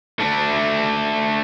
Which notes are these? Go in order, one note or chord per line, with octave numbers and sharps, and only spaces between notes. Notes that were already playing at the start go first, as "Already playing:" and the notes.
A3 D4